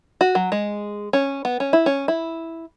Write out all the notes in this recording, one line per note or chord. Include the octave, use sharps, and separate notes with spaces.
F#4
F#3
G#3
C#4
B3
C#4
E4
C#4
E4